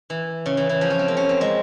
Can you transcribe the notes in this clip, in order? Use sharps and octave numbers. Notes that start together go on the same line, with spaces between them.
E3
C#3
E3
E3
F3
C#4
C4
A#3
C#4
C4
G#3